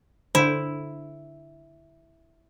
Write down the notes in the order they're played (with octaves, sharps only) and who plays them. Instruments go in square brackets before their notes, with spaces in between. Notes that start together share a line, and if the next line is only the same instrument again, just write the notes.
[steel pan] D3 C5 [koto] E4